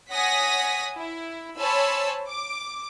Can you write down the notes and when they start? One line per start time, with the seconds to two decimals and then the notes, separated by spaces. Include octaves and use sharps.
0.12 C#5 F#5 G#5 D#6 A#6 B6
0.96 E4
1.59 C5 C#5 G#5 A5 B5 E6
2.29 D6